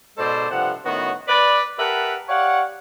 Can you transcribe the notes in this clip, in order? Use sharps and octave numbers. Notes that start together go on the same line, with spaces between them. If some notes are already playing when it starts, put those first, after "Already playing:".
G#2 B2 G#3 A4 C5 D5
G2 C3 F3 A4 F#5
A2 D#3 B3 C#4 F#4
B4 D5
G4 A#4 B4 E5 F#5 A5
G4 C#5 D5 F5 F#5